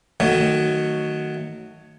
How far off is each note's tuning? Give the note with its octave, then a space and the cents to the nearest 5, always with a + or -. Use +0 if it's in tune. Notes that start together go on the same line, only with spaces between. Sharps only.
D#3 -5 F#3 +0 A3 +20